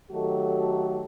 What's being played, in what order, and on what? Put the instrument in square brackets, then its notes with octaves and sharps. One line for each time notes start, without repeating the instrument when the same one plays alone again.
[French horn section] D#3 F#3 A3 F#4 G4 A4